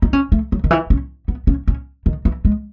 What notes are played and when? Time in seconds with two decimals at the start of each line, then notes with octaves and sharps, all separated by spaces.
0.02 D#4
0.13 C#4
0.32 A3
0.52 F#3
0.64 D#3
0.71 E3
0.90 C#4
1.28 B3
1.47 C#4
1.68 C#4
2.06 D#3
2.25 E3
2.45 G#3